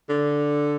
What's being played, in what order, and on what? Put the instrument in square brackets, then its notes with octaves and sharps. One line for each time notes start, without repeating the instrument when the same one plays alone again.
[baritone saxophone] D3